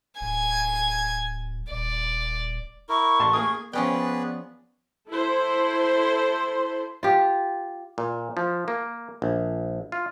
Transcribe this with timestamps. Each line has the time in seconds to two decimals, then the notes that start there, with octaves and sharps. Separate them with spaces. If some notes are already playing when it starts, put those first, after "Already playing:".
0.21 D1 G#5 G#6
1.71 D#1 D5
2.89 E4 A#4 C#6
3.19 A1 A5 C6
3.33 A#3 G#4 A#4 D#6
3.73 F3 B3 C#4 G#4 B4 D5 G5
5.09 E4 A4 C5
7.03 F4 G4
7.98 A#2
8.37 F3
8.68 A#3
9.22 A#1
9.92 F4